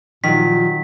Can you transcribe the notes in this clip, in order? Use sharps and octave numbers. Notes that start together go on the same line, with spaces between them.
A#2 D#3 F3 F#3 B6